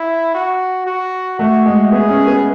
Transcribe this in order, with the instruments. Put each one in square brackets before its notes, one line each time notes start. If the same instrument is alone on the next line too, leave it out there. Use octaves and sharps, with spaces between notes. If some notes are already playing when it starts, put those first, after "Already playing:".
Already playing: [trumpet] E4
F#4
F#4
[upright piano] A3 [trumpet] F#4
[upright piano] G#3
[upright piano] B3 [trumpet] G#4
[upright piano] C#4
B3